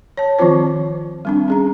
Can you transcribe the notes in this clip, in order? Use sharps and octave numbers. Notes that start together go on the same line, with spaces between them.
C#5 A5
D#3 F3 C4 F4 C5
G3 C4 D4
C#4 G#4 A#5